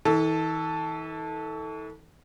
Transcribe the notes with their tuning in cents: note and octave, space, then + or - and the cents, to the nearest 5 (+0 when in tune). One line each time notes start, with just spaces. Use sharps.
E3 -45 A4 +0